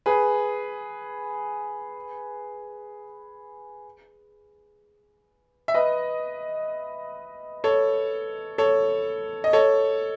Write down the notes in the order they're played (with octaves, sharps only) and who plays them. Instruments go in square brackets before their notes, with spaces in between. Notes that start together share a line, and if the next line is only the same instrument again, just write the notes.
[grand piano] G#4 B4
E5
B4 D#5
A4 C#5
A4 C#5
D#5
A4 C#5